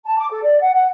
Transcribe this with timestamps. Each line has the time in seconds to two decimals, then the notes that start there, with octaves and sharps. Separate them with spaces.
0.05 A5
0.18 D6
0.30 A4
0.43 D5
0.61 F#5
0.74 F#5